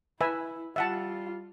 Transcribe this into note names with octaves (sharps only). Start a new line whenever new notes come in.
E4 B4 E5 G#5
G3 F4 E5 F#5 A5